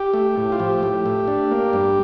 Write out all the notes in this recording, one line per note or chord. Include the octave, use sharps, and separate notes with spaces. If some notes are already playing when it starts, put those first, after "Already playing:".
Already playing: G4
A3
A2
F4
F3 G4
A2
A3
D4
A#3
G2